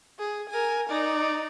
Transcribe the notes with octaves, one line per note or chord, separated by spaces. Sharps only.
G#4
A#4 G#5
D#4 D5